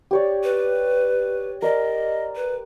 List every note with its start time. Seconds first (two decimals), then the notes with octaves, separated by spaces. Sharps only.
0.11 G4 C#5 D5
0.44 B4
1.62 A#4 C5 D5 D#5
2.36 B4